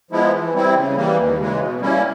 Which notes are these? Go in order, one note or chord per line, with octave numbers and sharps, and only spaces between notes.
F3 G#3 B3 E4
E3
G3 C4 E4
C#3
E3 G3 A#3
D#2
C#3 E3 G#3
B2
G3 A#3 C#4 E4